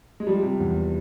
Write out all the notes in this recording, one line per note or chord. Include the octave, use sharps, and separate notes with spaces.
G#3
F3 G3
C3
E2